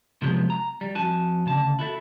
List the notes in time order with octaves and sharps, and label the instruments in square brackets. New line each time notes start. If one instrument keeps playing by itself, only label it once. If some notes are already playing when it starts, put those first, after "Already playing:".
[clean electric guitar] C3 F3 F#3 G#3 B3 G4
A#5
G3
F2 F#4 G#5 A5
D2 C#3 A5
E4 F#4 A4 E5